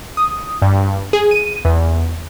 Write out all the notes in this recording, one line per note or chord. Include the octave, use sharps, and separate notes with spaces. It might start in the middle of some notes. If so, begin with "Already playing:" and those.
D#6
G2
G#4
D#7
E2